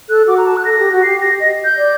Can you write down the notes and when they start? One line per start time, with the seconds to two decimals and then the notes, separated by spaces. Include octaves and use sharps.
0.09 A4 F#6
0.27 F#4 D6
0.38 A#5
0.47 A5
0.57 F#6
0.65 A4 A#6
0.79 G4
0.92 F#4
1.03 G4 C7
1.21 A#6
1.40 D#5 A#6
1.65 G6
1.77 D5